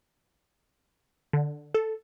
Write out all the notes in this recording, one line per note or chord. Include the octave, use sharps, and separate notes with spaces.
D3
A4